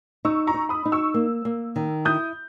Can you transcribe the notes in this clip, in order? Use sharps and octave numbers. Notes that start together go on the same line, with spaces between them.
D#4 C#6 E6
A#5 C#6
D#4
B5 D#6
D#4
C#6 E6
A#3
A#3
D#3
E4 D#6 G6